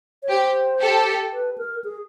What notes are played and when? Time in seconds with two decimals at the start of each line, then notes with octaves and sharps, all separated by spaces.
0.23 C#5
0.29 G4 C5
0.80 G4 A4
1.32 B4
1.58 A#4
1.84 G#4